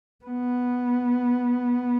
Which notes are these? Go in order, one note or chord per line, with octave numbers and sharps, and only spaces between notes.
B3